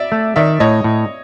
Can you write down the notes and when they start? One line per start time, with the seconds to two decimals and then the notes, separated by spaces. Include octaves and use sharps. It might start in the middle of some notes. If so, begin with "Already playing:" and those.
Already playing: D5 E5
0.12 A3
0.36 D#3 D5 E5
0.60 A2 C#5 D#5
0.84 A2